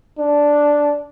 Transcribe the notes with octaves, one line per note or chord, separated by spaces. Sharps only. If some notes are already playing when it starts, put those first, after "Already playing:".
D4